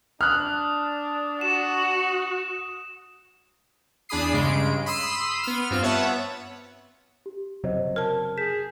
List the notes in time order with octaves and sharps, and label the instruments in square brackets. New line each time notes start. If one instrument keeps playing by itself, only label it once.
[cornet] D4 [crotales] D#6 [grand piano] F6 F#6
[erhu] F#4 [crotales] E7
[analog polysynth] E2 D4 G#4 B5 D#6 C7
G2 C#3 G#3 D7
B5 C6 D#6 E6 B6 C7
B3 F6
G2 C4 F4 F6
B3 C#5 E5 F#5 A5
[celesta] G4
[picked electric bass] F#1 C3 F#3 [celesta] C5 C#5 D#5
[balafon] A#4 A5 [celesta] F6
[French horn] G#4 [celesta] G6 B6 E7